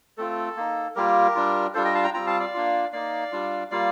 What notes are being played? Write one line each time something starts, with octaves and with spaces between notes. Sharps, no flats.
A3 C4 F4 A4
A#3 D#4
G3 A#3 F4 G4 A#4
G3 D4 F4
G3 D4 F4 A4 C5
D#5 G5
F5 A5
G5 A#5
G3 C4 F4 G5 A#5
F5 A5
D5 F5
A#3 D4 F4
A#3 D#4 D5 F5
G3 D4 F4
G3 A#3 F4 D5 F5